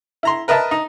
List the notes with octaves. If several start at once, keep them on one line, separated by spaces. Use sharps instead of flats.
E4 A#5 C6
A#4 B4 D#5 E5 A5
D#4